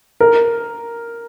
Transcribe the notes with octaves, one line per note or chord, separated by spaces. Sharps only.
A#4